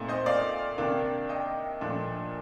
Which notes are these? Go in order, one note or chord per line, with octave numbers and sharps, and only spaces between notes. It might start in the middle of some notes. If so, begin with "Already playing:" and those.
Already playing: A#2 A3 C4 D#4
C5 D#5
D5 F5
C3 D#3 A#3 D4
D#5 G5
A#2 F3 A3 D4